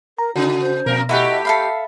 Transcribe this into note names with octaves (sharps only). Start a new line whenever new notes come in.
A#4 A#5
C#3 D#4 F#4
C5
F2 B2 A#4
A3 E4 F#4 G4 B4 D#5
A4 E5 F5 B5 C7